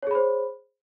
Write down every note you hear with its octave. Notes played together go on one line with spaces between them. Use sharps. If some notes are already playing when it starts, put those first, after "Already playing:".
G#4 C5 C#5 B5